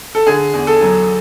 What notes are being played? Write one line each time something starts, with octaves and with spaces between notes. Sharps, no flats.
A4
D3 G#4
E2
A4
F#3